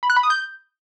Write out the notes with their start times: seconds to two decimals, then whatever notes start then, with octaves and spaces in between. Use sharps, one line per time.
0.03 B5
0.10 F#6
0.16 B5
0.23 D#6
0.30 G6